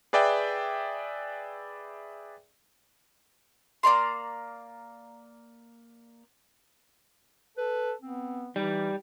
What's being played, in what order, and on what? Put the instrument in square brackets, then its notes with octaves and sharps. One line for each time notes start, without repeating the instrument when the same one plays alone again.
[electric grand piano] G#4 B4 D5 E5 G5
[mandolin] A#3 D5 A#5 C6
[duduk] A4 [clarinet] B4
[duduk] B3 [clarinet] C4
[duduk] E3 [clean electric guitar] G3 [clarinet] D#4